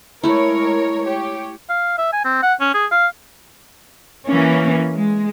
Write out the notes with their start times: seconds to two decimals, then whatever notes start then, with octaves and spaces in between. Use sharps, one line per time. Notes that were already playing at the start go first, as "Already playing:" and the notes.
0.24 G#3 A3 E4 A#4 C#5
1.04 G4 C#5
1.70 F5
1.98 E5
2.13 G#5
2.25 C4
2.43 F#5
2.61 C#4
2.74 G#4
2.92 F5
4.27 E3 A#3 C#4
4.93 G#3